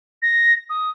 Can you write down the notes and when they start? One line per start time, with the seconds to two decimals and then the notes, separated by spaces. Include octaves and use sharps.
0.22 A#6
0.69 D#6